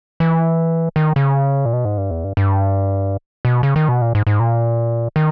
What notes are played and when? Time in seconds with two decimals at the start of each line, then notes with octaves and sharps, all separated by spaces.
0.20 E3
0.96 D#3
1.16 C#3
1.66 A#2
1.73 B2
1.85 G#2
1.98 G2
2.11 E2
2.24 G2
2.37 G2
3.45 B2
3.63 C#3
3.76 D#3
3.89 B2
4.02 A#2
4.15 G#2
4.27 G#2
4.40 A#2
5.16 D#3